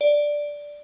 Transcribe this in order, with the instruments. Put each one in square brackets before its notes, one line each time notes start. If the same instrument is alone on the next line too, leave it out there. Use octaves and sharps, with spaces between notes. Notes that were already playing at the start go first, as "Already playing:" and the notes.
[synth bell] D5